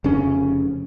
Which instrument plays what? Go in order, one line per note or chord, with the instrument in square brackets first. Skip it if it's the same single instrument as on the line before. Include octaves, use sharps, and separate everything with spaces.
[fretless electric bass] F1 C#3 C#4